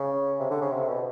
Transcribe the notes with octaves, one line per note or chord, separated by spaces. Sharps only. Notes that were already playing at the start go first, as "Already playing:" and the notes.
Already playing: C#3
C3
D3
C#3
C3
B2